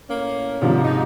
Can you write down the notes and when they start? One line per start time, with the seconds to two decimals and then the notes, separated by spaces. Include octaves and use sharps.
0.09 A2 A#3 C#4
0.62 G#2 C3 D#3 F3 A#3 D4
0.84 D#4